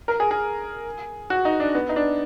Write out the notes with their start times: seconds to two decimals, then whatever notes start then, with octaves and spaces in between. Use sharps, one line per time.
0.08 A#4
0.20 G#4
0.31 G#4
1.30 F#4
1.45 D#4
1.60 D4
1.75 B3
1.89 D#4
1.96 D4